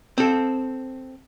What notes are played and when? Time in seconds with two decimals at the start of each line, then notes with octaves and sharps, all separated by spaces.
0.18 C4 A4